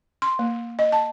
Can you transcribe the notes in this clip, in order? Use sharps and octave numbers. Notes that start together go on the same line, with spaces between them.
C6
A#3
D#5
A5